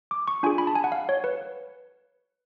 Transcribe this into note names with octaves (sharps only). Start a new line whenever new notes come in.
D6
C#6
D4 F4 G#4 G#5
B5
A5
G#5
F#5
F5
C#5
B4